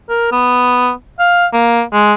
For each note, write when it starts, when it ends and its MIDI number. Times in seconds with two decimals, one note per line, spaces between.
0.09 0.28 70
0.32 0.91 59
1.19 1.46 77
1.53 1.83 58
1.93 2.13 56